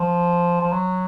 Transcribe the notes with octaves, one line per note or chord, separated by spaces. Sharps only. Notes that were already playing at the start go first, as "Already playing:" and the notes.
Already playing: F3
F3
F#3